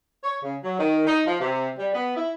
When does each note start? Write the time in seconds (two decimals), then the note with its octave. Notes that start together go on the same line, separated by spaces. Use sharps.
0.23 C#5
0.42 C#3
0.63 F#3
0.79 D#3
1.06 D#4
1.26 F3
1.39 C3
1.78 G3
1.94 B3
2.15 E4